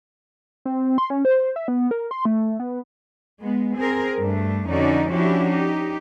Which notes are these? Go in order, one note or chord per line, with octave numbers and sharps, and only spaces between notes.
C4
C6
C#4
C5
E5
B3
A#4
C6
A3
B3
G#3 B3
C4 G#4 A#4
G2 A3 D4
F2 D3 C#4 D#4 F#4 D5
F3 C#4 D4 E4 F#4 G4
D#4 G4